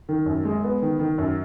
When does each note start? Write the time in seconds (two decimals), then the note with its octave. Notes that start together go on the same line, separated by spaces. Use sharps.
0.09 D#3
0.26 F#2
0.45 G#3
0.64 B3
0.82 D#3
0.99 D#3
1.18 F#2